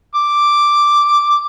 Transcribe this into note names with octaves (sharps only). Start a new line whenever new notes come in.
D6